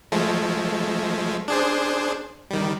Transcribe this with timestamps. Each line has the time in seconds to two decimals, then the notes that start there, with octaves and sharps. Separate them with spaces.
0.12 F3 G#3 A3
1.48 D4 G#4 C5
2.51 D#3 G3